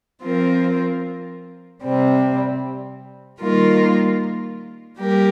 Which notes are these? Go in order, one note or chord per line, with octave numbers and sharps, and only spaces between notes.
F3 C4 F4 A#4
C3 G3 C4
D#3 G3 A#3 F4 A#4
G3 A#3 G4 A#4